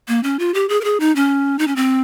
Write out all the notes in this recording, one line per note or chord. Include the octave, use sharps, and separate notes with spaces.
A#3
C#4
F4
G4
G#4
A#4
G#4
D#4
C#4
D#4
C#4
C4